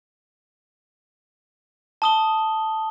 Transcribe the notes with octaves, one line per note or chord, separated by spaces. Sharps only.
A5 D#6 G7